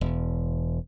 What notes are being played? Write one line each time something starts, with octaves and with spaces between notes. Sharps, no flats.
E1